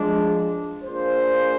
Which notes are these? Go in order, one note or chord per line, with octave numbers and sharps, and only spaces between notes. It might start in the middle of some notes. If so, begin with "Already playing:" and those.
Already playing: F3 G#3 D4
A#3 D4 F4 G#4 C5